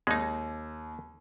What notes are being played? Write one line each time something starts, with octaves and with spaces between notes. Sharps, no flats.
D#2 G#3 D#4